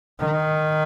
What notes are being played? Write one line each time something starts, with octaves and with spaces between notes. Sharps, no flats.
D#3